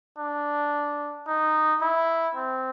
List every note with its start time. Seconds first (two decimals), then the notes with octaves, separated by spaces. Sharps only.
0.18 D4
1.27 D#4
1.81 E4
2.35 C4